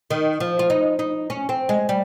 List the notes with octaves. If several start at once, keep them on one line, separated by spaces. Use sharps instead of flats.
D#3
F3
F4
D#4
D#4
C#4
C4
G#3
G3